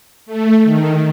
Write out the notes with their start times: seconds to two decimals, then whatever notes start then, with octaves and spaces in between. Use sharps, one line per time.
0.26 A3
0.64 D#3